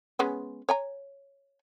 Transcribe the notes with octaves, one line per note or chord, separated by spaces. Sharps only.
G#3 B3 C#4
C#5 G#5 A#5